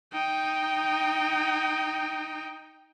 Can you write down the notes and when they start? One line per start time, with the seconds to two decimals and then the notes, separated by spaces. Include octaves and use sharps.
0.13 D#4 G5